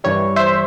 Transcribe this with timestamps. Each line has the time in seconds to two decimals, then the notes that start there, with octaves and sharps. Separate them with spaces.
0.04 G2 E3 G3 C#5
0.36 C5 E5